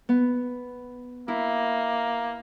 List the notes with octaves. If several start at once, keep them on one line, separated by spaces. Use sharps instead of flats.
B3
A#3 E4